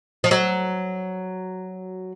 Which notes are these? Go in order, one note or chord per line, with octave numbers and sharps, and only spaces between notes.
F3
F#3